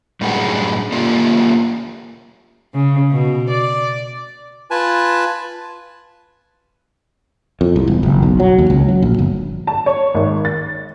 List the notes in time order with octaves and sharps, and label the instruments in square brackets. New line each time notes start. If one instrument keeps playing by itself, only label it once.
[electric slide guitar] F#2 A2 G3 D4 G#4 F#5
A#3 D4 F4 G4 A4
[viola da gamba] C#3
B2
D5
[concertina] F4 B4 G#5 A5
[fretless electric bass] F2
C2
E1
F#1
B1
F#3
D#2
C#2
F#3
A#1
G1
[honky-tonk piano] A5
C#5
G#1
A6